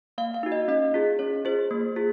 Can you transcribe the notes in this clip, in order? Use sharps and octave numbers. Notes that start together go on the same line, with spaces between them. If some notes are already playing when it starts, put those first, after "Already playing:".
A#3 F5
F5
D#4 F#4
D#5
C#4 D#5
F4 G#4
C#4 C#5
F4 G#4 C5
A#3 C5
F4 G#4